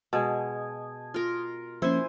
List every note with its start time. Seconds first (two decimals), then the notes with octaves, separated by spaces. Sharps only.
0.13 B2 G#3 A5 D#6 G#6
1.14 F4 A#4
1.82 F3 A#3 C#4 E4 C5 G#5